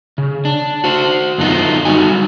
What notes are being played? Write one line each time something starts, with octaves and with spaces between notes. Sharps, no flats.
C#3
D4
F#4 C5
F#2 D3 B3 D#4 F4
G3 D#4 F#4 G#5